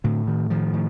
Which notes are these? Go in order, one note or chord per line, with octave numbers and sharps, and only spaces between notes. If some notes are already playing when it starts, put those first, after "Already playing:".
A2 D3
D#3
D#3 F3
A2